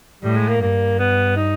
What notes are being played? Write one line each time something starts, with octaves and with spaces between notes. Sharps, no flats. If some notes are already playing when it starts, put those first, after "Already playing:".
A2 G3
G#3
A#3
G2 A#3
B3
D#4